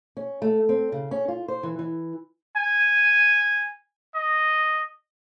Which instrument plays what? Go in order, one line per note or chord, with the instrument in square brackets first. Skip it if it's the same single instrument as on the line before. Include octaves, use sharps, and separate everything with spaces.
[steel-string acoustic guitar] C#4
A3
C4
C#3
C#4
F4
C5
E3
E3
[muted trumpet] G#5
D#5